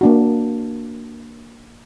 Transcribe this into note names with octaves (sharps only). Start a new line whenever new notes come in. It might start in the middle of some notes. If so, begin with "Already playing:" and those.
A#3 D4 F#4